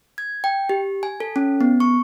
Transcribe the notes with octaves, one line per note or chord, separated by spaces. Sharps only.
G#6
G5
G4
G#5
A4
C#4
B3
C#6